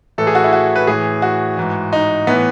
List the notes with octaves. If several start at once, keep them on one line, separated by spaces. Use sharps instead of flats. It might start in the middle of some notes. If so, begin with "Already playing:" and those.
A2 E3 A4
G#4
F#4
E4
F#4
B4
A2 E3 G#4
F#4
G#2 E3
D#4
A2 E3 B3